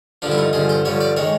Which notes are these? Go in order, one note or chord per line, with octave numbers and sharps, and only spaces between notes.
G2 D3 F3 D4
E4
D#4
G2 D3 F3 G#4
C5
G2 D3 F3 C#5
D5
D#3 G#3 C#5